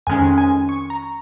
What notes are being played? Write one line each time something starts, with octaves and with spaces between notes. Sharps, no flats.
F2 D#3 G#3 C#4 G#5
G#5
C#6
A#5